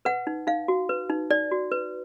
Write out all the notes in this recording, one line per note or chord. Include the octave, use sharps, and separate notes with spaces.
B4 F#5
D#4
D#4 F5
F#4
B4
D#4
D#4 D5
F#4
B4